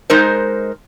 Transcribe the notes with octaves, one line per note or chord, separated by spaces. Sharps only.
G#3 D#4 A#4 C5